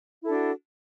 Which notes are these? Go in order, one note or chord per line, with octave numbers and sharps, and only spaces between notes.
D4 E4 F#4 A4